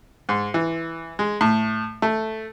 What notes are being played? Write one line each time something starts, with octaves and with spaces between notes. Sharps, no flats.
G#2
E3
G#3
A2
A3